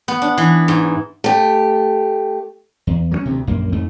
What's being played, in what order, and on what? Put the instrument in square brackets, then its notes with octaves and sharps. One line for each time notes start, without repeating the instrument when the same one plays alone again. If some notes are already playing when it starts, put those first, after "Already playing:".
[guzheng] B3
D4
E3
G#2
[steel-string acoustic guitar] A3 G4
[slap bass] E2
F#3 G3 C#4
D2 C3
A#1 F#2 A#3
F2 G#2 A3